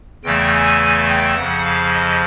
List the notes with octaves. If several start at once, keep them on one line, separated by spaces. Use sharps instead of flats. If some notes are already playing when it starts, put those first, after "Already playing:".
E2 C#3 E3 A3 G5
G#5
G#5
G5
F2 C#3 F3 F#5
F5
D#5